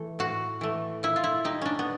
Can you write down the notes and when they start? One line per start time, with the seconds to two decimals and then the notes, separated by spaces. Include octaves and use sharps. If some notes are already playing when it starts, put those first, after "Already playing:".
Already playing: E3 A3
0.19 A2 F#4
0.61 E3 A3
1.03 A#2 E4
1.16 F4
1.24 E4
1.44 G3 D#4
1.62 C#4 D4
1.79 B3